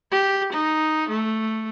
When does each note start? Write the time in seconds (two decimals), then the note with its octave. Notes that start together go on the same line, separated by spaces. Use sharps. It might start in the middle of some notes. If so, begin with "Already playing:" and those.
0.11 G4
0.53 D#4
1.09 A3